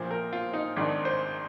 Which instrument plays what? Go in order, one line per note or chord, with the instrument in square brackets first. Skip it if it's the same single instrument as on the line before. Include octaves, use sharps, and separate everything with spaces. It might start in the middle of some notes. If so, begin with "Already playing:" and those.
Already playing: [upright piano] A#1 A#2 F3 C5
A#4
F4
D#4
G#1 G#2 D#3 D4
C5